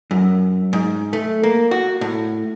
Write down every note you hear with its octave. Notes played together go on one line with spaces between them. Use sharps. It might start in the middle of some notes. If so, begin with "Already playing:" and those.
F#2
G#2
A3
A#3
F#4
A2